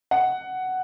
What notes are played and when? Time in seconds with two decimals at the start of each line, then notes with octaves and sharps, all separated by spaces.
0.11 F#5